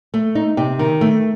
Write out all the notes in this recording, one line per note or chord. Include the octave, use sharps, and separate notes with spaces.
A3
D#4
C3
D#3
A3